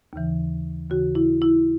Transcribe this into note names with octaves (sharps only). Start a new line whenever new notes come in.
D#2 C#3 E3
D#2 C#3 E3 F#4
E4
E4